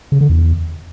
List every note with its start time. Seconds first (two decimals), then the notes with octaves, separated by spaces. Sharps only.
0.12 C#3
0.21 D3
0.29 E2